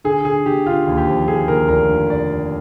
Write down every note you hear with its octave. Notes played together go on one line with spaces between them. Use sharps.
D3 G#4
D3 G#4
D3 G4
D3 F4
D#2
G4
F3
D3 G#4
D#2 A#4
F1 A#4
D3
D5